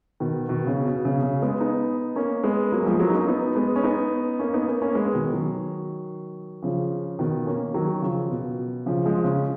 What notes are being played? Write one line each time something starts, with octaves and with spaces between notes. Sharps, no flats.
B2 D#3
B2 D#3
C#3
B2
C#3
C#3
G#3 B3
B3 D#4
A#3 C#4
G#3 B3
F#3 A#3
F3 G#3
F#3 A#3
D#4
A#3 C#4
B3 D#4
G#3 B3
C#4
B3 D#4
A#3 C#4
B3 D#4
A#3 C#4
A#3 C#4
G#3 B3
B2 D#3
D#3 F#3
C#3 F3
B2 D#3
A#3 C#4
D#3 F#3
C#3 F3
B2
C#3 F3
F3 G#3
C#3